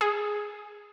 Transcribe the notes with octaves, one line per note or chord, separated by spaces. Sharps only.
G#4